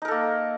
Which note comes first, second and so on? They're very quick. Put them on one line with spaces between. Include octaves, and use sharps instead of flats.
D#4 A#4 A4 A#3